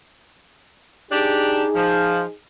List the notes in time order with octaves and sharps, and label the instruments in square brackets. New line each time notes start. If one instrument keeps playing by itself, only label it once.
[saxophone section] D4 G4 [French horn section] D#4 G#4
[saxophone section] F3